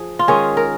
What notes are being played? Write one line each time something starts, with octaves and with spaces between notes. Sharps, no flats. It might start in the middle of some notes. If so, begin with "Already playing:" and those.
Already playing: F3 G#4
F4
D#3 G#3 C#4 G#4
A#4